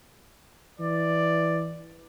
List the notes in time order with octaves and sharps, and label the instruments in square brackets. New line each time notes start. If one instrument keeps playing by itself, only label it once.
[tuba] E3 [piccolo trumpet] D5